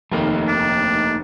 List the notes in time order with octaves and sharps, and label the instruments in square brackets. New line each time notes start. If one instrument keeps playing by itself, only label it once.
[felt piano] F1 D#2 [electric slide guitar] A3 A#3 D#4
[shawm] D4